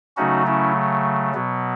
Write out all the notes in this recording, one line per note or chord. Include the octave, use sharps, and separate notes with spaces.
C#3 F#3 A3 C#4 D#4 F#4
C#4 E4
B2 F#3 B3